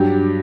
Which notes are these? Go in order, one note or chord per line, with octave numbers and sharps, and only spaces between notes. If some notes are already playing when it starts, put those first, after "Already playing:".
Already playing: G2 F#3 G4